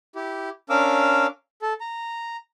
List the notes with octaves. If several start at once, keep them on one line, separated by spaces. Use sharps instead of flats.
E4 G4
C#4 D4 A#4 F5 D6 E6
A4
A#5